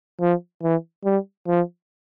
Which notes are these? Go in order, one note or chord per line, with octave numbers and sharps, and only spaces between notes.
F3
E3
G3
F3